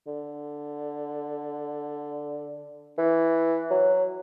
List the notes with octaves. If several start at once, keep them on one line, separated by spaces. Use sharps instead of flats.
D3
E3
F#3